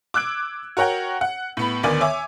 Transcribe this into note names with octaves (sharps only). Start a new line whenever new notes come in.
D6 E6 F#6 G#6 D7
F#4 A#4 C#5 F#5 G5
F#5
A2 B3 B5
D2 D#3 B3 D5 G#5
C#5 E5 G#5 D6